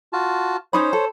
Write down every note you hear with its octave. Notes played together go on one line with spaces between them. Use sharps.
F4 F#4 A5
C#4 D#4 C5 C#5 B5
A4